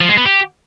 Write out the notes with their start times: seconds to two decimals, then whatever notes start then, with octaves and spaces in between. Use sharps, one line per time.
0.01 F3
0.09 G#3
0.17 B3
0.26 G4